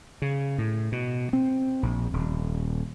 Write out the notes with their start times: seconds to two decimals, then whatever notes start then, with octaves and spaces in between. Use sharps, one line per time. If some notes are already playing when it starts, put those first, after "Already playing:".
0.22 C#3
0.58 A2
0.92 B2
1.33 C4
1.83 A#1
2.13 D#1